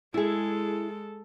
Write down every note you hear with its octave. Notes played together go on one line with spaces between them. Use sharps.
G#3 E4 G#4 A4